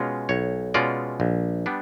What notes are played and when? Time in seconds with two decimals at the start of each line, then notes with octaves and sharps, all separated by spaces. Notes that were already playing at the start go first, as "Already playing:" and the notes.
Already playing: B2 G#3 C#4 F4
0.29 B1 C#5
0.74 B2 G#3 C#4 F4 D5
1.20 A#1
1.66 G3 B3 D4